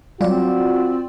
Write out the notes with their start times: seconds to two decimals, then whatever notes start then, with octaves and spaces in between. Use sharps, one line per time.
0.21 F#3 G3 C4 F4 F#4 D5